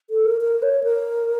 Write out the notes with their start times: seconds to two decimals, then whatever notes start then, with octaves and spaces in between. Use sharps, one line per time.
0.10 A4
0.25 A#4
0.41 A#4
0.62 C#5
0.84 A#4